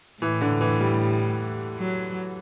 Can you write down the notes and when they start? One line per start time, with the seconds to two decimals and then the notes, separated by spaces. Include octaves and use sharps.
0.21 A2 E3
0.41 D3
0.61 E3
0.80 G3
1.78 F#3